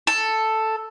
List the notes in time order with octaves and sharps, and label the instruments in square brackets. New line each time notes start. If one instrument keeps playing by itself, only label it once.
[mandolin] A4